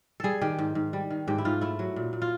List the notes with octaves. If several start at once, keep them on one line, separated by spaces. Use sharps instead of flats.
G3 G#4 A4
D#3 G4
G#2
G#2
G3
D#3
G#2 G4
E4
G#2 F4
A3 E4
F#3
A#2
A#2
F4